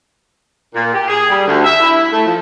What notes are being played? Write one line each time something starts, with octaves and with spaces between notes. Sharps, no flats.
A#2
G4
G#4
G3
D2
E5
E4
A3
F3